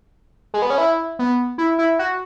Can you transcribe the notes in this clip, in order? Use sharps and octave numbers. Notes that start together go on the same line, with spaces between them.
G#3
B3
C#4
E4
B3
E4
E4
F#4